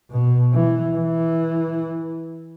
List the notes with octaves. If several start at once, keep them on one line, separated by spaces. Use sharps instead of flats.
B2
E3
E3